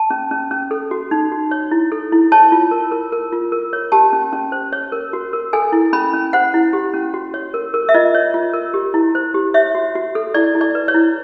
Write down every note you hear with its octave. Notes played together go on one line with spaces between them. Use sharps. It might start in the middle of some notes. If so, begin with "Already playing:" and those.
Already playing: A5
C#4
C#4
C#4
A4
F#4
D#4
F#4
C#5
E4
A4
E4
C#5 A5
F4
A#4
A#4
A#4
F4
A#4
C#5
G4 A5
C#4
C#4
C5
C#5
A#4
F#4
A#4
A4 G#5
E4
C#4 B5
C#4
C5 F#5
E4
G4
C#4
F#4
C#5
A#4
A#4
E5
F4 D#5
C#5
F4
A#4
G4
E4
C5
G4
C#5 E5
F#4
F#4
A4
E4 D5
E4
D5
B4
C#5
E4